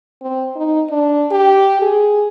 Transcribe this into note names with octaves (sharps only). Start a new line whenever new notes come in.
C4
D#4
D4
G4
G#4